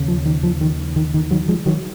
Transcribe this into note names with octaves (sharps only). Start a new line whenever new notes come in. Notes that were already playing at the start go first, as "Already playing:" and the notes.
Already playing: D#2 C#3
F3
D#3
F3
D#3
D#3
D#3
D#3 F#3
F3 G#3
D#3 F#3